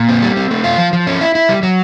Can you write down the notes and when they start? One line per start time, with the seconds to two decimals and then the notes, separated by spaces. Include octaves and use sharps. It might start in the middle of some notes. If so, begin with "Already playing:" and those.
Already playing: A#2
0.09 C4
0.22 G3
0.36 C4
0.51 A3
0.64 F4
0.78 F3
0.93 F3
1.07 C#4
1.21 E4
1.35 E4
1.49 G3
1.63 F#3